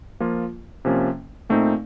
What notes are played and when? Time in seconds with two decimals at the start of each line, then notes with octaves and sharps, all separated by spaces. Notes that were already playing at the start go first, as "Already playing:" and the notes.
0.20 F3 A#3 F4
0.85 C3 F3 A#3 C#4
1.49 A#2 A3 C4 D#4